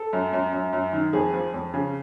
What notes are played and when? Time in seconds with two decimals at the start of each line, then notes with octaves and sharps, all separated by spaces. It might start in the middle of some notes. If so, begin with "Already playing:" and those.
Already playing: A4
0.13 F#2
0.33 F#2
0.53 F#2
0.73 F#2
0.93 D#3
1.13 F2 G#4
1.33 F3
1.54 F2
1.74 C#3